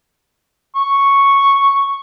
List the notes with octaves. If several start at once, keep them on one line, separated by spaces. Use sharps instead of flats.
C#6